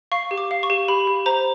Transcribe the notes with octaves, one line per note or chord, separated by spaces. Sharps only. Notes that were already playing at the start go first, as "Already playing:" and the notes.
F5 C#6
G4
D6
F5
C#6
G4
G4 B5
G4
C5 A#5